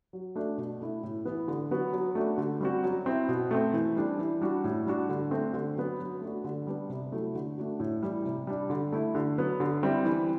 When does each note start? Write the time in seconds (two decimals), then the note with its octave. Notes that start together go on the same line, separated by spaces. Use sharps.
0.13 F#3
0.35 A3 D4 F#4
0.58 B2
0.80 A3 E4
1.03 A2
1.25 E3 B3
1.48 D3
1.71 F#3 B3 F#4
1.93 F#3
2.15 A3 D4 F#4
2.38 D3
2.60 G3 C4 F#4
2.84 F#3
3.06 C4 E4
3.29 B2
3.51 A3 C4
3.73 E3
3.96 G3 D4
4.19 E3
4.41 G3 D4 F#4
4.64 A2
4.87 G3 D4 F#4
5.09 D3
5.31 A3 C4
5.54 D3
5.76 F#3 B3
5.99 F#3
6.21 A3 D4 F#4
6.44 D3
6.67 G3 B3 D4
6.90 C3
7.12 F#3 A3 E4
7.35 D3
7.58 A3 D4 F#4
7.80 A2
8.02 E3 G3
8.25 C3
8.47 G3 D4
8.70 D3
8.92 A3 E4
9.15 D3
9.38 F#3 B3
9.60 D3
9.83 G3 C4 E4
10.05 E3